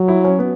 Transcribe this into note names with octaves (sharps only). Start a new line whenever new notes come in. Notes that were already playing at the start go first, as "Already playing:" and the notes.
Already playing: F#3
E4
C#4
B3